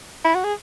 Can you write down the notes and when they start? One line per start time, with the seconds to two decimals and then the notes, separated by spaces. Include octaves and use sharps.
0.24 E4
0.35 F#4
0.44 G#4